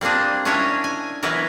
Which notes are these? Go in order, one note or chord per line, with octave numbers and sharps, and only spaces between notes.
G3 A#3 C4 D4 G#4
C#4 D4 E4 A#4 C#5 D#5
G#5
E3 F#3 B3 E4 F#4 A#4